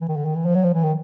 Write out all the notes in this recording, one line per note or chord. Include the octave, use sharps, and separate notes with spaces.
E3
D#3
D3
D#3
E3
F3
F#3
F3
E3
D#3